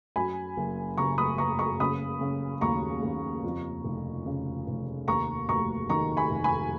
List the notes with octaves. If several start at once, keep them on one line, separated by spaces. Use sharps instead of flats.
F#2 G#5 B5
F#1
C#3 A#5 C#6
B5 D#6
F#1 A#5 C#6
A#5 C#6
C#3 B5 D#6
C#3
D#2 A#5 C#6
D#2
F2
F1
C#3
F1
D#2 A#5 C#6
F1 A#5 C#6
D#3 A#5 C#6
G#5 B5
F1
G#5 B5